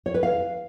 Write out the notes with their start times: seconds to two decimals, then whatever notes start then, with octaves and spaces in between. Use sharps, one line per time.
0.06 C#5
0.14 B4
0.23 F5